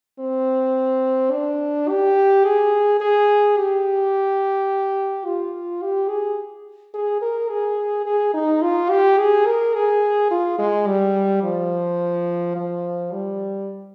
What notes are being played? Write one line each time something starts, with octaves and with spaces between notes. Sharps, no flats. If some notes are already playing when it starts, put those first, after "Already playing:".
C4
D4
G4
G#4
G#4
G4
F4
G4
G#4
G#4
A#4
G#4
G#4
D#4
F4
G4
G#4
A#4
G#4
F4
G#3
G3
F3
F3
G3